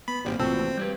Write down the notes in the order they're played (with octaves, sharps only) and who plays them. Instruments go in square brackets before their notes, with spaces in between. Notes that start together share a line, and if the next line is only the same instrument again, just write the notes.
[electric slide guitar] B3 [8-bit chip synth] B5
[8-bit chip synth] G#1 [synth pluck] G2 [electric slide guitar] A#2 A#3 C4
[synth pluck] A#1 C3 A3 [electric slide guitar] A2 E3 F#4 [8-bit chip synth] C4
[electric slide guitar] G3 G4 B4 [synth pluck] G6 G#6